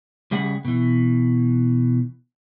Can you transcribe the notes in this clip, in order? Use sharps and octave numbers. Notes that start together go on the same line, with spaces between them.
C#3 G3 G#4 E5 F#5
B2 E3